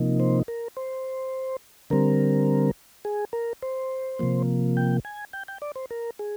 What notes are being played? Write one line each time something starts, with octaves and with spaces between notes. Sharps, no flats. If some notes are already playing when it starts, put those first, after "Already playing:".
Already playing: C3 F3 A#3 D#4
C5
A#4
C5
D3 G3 C4 A#4
G#4
A#4
C5
C3 F3 A#3
G5
G#5
G5
G5
D5
C5
A#4
G#4